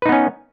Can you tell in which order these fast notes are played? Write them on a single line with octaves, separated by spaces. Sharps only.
B4 D#4 B3 C#4